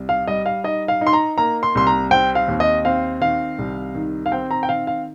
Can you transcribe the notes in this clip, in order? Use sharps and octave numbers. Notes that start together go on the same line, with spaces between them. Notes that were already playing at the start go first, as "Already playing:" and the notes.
Already playing: C2
F5
G3 D#5
F5
D#4 D#5
F5
D#4
C6
A#5
A#3 A#5
C6
C2 C6
A#5
C4 G5
F5
D#2
D#5
C4 F5
D#3 F5
C2
D#3
F5
C4 G5
A#5
G5
D#3 F5
F5